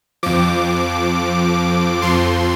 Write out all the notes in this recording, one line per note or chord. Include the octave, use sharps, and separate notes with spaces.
F2 F3 D6
F2 F3 C6